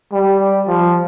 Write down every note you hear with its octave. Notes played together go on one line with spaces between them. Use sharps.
G3
F3